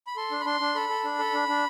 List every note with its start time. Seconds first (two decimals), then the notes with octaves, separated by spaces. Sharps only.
0.07 B5
0.16 A4 C6
0.31 D4
0.41 B5
0.45 D4 C6
0.61 D4
0.75 A4 B5
0.89 A4
1.04 D4
1.19 A4
1.34 D4
1.48 D4